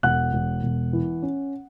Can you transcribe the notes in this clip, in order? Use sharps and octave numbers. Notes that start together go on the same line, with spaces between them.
E1 F#5 F#6
E1
E1
E3
C#4